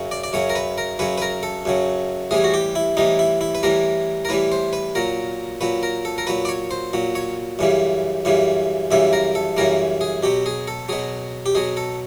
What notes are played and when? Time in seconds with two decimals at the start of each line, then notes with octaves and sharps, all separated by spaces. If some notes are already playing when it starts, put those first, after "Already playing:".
Already playing: F#2 C#3 F#3
0.11 D5
0.24 D5
0.33 F#2 C#3 F#3 C#5
0.50 A#4
0.55 B4
0.78 A#4
0.99 F#2 C#3 F#3 B4
1.18 B4
1.22 A#4
1.43 A4
1.65 F#2 C#3 F#3
2.31 A2 E3 G3 G#4
2.44 F#4
2.54 G4
2.75 E4
2.97 A2 E3 G3 D#4
3.19 E4
3.41 E4
3.55 B4
3.63 A2 E3 G3 A#4
4.25 A#4
4.29 A2 E3 G3 B4
4.52 C5
4.73 B4
4.95 A#2 F#3 A#4
5.61 A#2 F#3 B4
5.83 A#4
6.05 A4
6.18 A#4
6.27 A#2 F#3 B4
6.45 D5
6.49 C#5
6.71 C5
6.93 A#2 F#3
7.15 C#5
7.59 F#2 C#3 E3 G3
8.25 F#2 C#3 E3 G3
8.91 F#2 C#3 E3 G3 E5
9.13 A#4
9.35 A4
9.57 F#2 C#3 E3 G3 A#4
10.01 G#4
10.23 B2 F#3 G4
10.46 G#4
10.68 A4
10.89 B2 F#3 G#4
11.46 G4
11.55 B2 F#3 G#4
11.77 A4